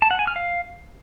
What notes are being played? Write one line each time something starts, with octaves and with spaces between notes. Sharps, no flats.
A5
F#5
G#5
F6
F5